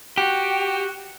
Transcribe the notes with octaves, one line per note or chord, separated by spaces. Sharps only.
F#4 G4